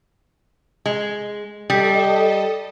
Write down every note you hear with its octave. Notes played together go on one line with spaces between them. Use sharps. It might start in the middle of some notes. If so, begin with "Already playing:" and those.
G#3
G3 A4 D#5